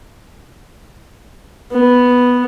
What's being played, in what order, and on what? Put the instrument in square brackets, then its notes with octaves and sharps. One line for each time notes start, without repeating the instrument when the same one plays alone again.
[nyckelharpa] B3